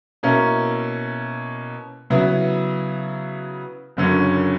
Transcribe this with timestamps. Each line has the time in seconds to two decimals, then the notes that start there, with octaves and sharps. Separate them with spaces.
0.23 B2 A#3 C#4 E4 A#4
2.10 C#3 F#3 B3 E4 B4
3.97 F#1 F#2 D3 F#3 C#4